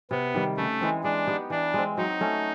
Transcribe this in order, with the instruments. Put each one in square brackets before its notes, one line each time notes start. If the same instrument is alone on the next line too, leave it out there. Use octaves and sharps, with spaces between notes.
[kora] C3 [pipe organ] B3
[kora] D#3 G3
[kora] C#3 [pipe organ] A3
[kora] E3 G#3 C4
[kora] G#3 [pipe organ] D4
[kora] B3 D#4 G4
[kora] E3 [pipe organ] D4
[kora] G#3 C4
[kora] F#3 [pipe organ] D#4
[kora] A3 C#4